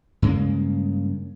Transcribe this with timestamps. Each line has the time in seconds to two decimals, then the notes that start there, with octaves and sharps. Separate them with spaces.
0.22 G2 C#3 G#3 A#3